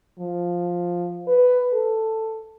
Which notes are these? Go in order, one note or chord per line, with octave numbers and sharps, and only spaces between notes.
F3
B4
A4